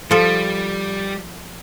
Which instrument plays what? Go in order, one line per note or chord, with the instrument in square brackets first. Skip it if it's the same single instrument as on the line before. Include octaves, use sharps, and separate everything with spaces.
[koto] F3 A4 [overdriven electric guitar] G3